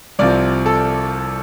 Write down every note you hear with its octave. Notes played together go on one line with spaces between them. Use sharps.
C2 C3 F3 D5
A4